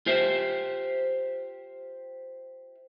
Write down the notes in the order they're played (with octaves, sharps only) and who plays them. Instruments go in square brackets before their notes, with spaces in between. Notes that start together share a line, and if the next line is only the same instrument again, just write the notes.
[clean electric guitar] F4 G4 C5 E5